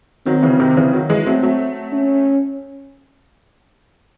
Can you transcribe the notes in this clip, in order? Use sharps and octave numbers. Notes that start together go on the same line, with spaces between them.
D#3 F#3 C4
C#3 E3
C3 D#3
C#3 E3
D#3 F#3
E3 G#3
F#3 A3 C4
F#3 A3
C#4